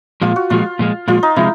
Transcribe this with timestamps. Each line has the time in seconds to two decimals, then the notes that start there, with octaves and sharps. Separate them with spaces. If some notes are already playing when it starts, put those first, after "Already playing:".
0.22 A#2 F3 G#3 F4
0.36 F#4
0.50 A#2 F3 G#3 F4
0.79 A#2 F3 G#3
1.08 A#2 F3 G#3 F4
1.23 D#4
1.36 C3 F3 G#3 E4